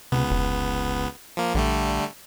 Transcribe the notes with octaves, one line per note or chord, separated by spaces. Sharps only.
C#2 C3 B3
F1
F3 A#3
A#1 D3 G3 A3